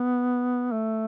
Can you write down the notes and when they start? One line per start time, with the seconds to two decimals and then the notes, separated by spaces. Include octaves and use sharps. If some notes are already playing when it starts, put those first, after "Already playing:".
Already playing: B3
0.72 A3